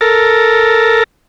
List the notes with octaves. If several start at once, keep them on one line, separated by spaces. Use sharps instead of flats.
A4 A#4